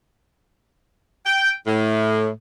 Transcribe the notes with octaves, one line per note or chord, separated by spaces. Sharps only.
G5
A2